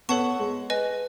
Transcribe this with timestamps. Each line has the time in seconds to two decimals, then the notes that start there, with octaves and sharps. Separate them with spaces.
0.09 B3 A4 C#5 F#5 A5 C#6
0.39 G#3
0.70 B4 D#5 G#5